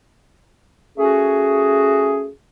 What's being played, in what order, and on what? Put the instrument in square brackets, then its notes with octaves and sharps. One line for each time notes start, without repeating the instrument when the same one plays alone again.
[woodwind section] A3 C#4 F#4 G#4